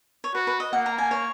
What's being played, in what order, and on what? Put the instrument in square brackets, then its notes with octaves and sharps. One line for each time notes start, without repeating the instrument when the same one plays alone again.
[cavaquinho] C#5
[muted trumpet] F#4 [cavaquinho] B4
[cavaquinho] B4
D#5
[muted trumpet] A#3 [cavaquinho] F#5
[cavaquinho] A#5
G#5
C#5